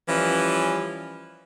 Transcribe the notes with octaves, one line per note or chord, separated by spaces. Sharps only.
E3 F3 G3 C#4